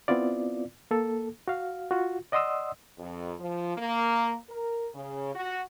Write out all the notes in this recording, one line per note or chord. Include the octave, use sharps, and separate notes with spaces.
B3 C4 E4 F4 D5
A#3 A4
F#4 F5
F4 F#4
D5 D#5 F#5 C6 D#6 E6
F2
F3
A#3
A#4
C#3
F#4